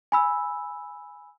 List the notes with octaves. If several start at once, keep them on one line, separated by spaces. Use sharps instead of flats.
G#5 B5 E6